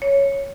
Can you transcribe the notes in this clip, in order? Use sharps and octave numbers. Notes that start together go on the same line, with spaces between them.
C#5